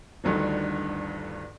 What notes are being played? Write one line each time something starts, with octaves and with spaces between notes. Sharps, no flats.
G1 D2 G2 D3 D#3